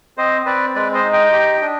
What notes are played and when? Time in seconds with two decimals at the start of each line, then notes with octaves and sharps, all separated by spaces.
0.17 C4 C5 D#5
0.46 C4 B4 D5
0.75 G#3 B4 D5
0.94 C5 D#5
1.04 D#4
1.13 D#5 G5
1.32 G4
1.61 D4